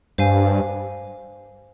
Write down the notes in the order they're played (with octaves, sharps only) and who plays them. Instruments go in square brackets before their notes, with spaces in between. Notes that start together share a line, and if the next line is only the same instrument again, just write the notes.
[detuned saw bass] G2 [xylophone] C5 F5 G#5